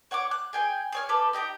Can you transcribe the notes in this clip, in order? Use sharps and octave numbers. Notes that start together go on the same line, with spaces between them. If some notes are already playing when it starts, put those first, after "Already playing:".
C#5 F#5 C#6 D6
F#6
G#4 G5 G#5
G#4 C#5 F6
G4 A4 B4
D#4 G4 G5 A#5